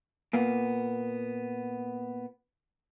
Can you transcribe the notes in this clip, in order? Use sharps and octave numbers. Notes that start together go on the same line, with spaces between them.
A#2 A#3 B3